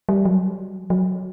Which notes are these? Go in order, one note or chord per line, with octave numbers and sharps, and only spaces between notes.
G3
F#3
F#3